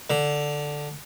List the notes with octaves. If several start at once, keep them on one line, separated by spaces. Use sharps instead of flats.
D3